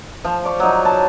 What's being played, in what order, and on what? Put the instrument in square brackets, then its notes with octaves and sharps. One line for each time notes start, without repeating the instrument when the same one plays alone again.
[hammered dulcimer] F3
D5 C#6
F#3 D#4
A5